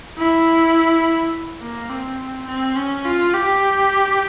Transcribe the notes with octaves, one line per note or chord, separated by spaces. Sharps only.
E4
A#3
C4
C4
C#4
F4
G4